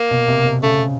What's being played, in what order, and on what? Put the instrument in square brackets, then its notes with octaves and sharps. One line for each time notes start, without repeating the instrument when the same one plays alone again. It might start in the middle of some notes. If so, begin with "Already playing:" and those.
Already playing: [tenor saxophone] A#3
[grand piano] B2
C3
C3
[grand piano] C#3 [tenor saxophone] A3